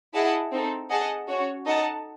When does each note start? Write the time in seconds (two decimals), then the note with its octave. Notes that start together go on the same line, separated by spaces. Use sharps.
0.13 E4 G#4 D#5 F#5 A5
0.52 C4 D#4 A4
0.90 G#4 D#5 F#5 A5
1.28 C#4 F#4 C#5
1.66 D#4 A4 D#5 F#5 A5